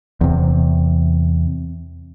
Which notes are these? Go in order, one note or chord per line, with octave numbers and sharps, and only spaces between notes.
E2 C3